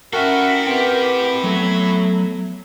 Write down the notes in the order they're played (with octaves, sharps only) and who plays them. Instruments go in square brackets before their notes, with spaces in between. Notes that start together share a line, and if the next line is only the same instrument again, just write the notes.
[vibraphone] C#4 E5 G5 [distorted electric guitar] E4 A4 [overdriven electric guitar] F#4 [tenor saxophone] A#4
[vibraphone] C4 B4 F#5 [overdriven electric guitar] G4 G5
[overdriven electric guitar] F#3 [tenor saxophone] A3 [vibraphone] B3